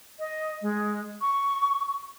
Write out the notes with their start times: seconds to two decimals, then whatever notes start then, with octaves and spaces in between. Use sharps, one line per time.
0.19 D#5
0.62 G#3
1.21 C#6